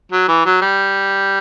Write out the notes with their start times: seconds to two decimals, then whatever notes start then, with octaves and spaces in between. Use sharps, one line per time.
0.12 F#3
0.28 E3
0.46 F#3
0.62 G3